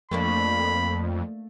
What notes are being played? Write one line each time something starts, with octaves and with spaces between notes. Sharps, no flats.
F2 A3 A#3 D4 B5